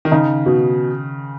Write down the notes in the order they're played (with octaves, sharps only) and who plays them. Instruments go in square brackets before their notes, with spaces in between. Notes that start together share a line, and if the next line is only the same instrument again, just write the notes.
[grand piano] D#3
[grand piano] C#3 [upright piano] D#4
[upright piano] B2